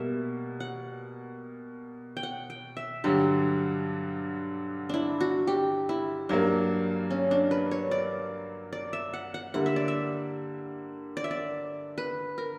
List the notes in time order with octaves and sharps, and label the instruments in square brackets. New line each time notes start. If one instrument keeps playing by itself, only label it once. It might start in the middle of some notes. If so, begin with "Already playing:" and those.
Already playing: [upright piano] B2 G3 A#3 [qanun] E5
[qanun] F#5
G5
F#5
G5
E5
[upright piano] G2 D3 F#3 [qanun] G4
[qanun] D4 E4
F#4
G4
E4
[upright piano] G2 F#3 A#3 [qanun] D4
[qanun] C#4
D4
B4
C#5
D5
D5
E5
F#5
F#5
[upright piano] D3 G3 A#3 E4 [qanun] F#5
[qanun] E5
D5
E5
D5
E5
D5
B4
A#4